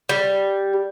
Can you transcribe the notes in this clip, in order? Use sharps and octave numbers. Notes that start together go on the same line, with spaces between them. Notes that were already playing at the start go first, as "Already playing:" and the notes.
G3